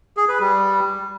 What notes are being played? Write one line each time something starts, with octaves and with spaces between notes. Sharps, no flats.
G#4
B4
G3